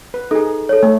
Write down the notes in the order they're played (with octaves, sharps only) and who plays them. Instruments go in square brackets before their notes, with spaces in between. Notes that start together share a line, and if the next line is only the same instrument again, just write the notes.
[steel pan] B4
[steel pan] D#4 G#4 [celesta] A4
[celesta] A4 C#5
[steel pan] A3